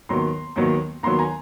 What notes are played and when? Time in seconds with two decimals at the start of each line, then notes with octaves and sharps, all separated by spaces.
0.09 D#2 D#3 F#3 B3 A#5 C6
0.56 D#2 D#3 F#3 B3
1.03 D#2 D#3 F#3 B3 A#5 C6
1.19 G#5 A#5